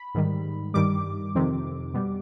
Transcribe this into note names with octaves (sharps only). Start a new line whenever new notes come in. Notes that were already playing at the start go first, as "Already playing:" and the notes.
Already playing: B5
G#2 D#3 G3
G2 D#3 G3 D6
F2 C3 D#3
B2 G3